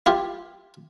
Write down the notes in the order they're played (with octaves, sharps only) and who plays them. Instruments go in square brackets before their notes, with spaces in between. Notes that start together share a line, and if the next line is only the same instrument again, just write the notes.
[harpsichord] E4 F4 G4